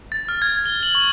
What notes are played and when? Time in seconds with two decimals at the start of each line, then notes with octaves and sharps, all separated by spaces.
0.12 A6
0.29 F6
0.42 G#6
0.66 G7
0.83 F#7
0.95 C#6